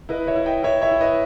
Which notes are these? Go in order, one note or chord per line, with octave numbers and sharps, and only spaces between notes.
E4 B4 D#5
C#5 E5
E4
D#5 G5
E4 C#5 E5
C#5 E5
E4
B4 D#5